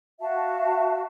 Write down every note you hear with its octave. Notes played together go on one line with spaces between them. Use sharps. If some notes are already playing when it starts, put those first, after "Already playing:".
F#4 E5 F5 A5